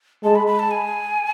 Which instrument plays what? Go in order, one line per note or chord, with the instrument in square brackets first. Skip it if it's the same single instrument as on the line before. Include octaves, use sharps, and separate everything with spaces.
[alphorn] G#3 [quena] A5
[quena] B5
B5
A5
G#5